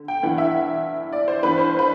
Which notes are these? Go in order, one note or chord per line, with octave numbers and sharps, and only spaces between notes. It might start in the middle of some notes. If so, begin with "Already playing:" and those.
Already playing: D3
G5
G2 E3 F#5
E5
D5
C5
G2 E3 B4
C5
B4